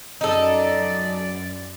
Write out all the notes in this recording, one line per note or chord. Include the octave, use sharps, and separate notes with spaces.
F#2 D#4 A4 D5